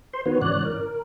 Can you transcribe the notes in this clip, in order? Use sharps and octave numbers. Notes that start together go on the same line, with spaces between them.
C5 C6
D#3 B3 F#4 B4 C#5
G#2 C#3 E3 C#5 D5 F#6
A#4